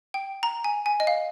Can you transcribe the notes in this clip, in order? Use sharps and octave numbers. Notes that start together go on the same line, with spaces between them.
G5
A#5
G#5
G#5
D#5
F5